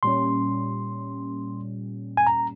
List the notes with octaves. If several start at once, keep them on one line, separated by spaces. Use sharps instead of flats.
A#2 G3 C#4 C6
G#5
A#5